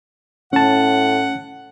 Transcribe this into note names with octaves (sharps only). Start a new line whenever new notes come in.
A2 C#4 F#5 A5